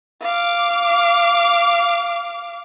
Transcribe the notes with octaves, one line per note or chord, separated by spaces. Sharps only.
F5 D6